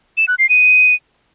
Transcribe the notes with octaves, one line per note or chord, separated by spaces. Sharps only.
E7
F#6
C7
D#7